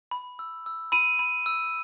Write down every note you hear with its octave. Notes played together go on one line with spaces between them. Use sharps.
B5
E6
E6
B5 D#7
B5
E6